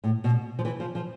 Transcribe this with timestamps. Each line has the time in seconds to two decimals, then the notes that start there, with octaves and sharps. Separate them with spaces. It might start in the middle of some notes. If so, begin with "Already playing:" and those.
0.04 A2
0.24 B2
0.59 F3
0.65 E3
0.80 F3
0.95 F3